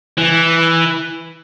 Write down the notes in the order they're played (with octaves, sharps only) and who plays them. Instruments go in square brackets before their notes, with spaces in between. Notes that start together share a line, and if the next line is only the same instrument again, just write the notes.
[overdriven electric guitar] E3